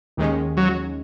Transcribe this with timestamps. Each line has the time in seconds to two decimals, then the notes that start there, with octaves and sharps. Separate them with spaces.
0.17 D#2 D#3 G#3 C#4
0.57 F#3